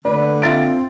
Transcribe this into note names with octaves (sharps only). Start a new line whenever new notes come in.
D3 A3 B4 D5
C4 F4 E5 A6 D7